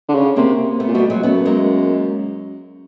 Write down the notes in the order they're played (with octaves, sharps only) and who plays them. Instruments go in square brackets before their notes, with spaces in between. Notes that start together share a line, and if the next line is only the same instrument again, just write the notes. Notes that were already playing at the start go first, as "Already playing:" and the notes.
[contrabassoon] D3
C#3
[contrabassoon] C3 [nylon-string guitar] A#3 C4
[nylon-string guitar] A3 B3
[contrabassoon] A#2
[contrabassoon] B2 [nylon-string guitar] G3 A3
[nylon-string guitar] F#3 G#3
[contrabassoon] F#2 [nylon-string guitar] A3 B3
[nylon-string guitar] G#3 A#3